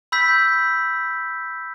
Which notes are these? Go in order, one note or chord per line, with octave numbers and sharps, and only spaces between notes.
B5 E6 G6 B6